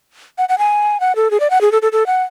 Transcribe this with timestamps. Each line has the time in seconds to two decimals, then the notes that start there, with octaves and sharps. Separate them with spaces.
0.38 F#5
0.49 F#5
0.58 G#5
1.00 F#5
1.16 A4
1.31 G#4
1.40 D5
1.50 F#5
1.61 G#4
1.72 A4
1.82 A4
1.92 A4
2.06 F#5